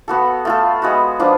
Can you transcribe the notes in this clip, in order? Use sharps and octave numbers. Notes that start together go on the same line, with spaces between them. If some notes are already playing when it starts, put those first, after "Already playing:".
B3 F#4 A4
A3 F4 A4
G#3 B3 F#4
F3 B3 D4 F4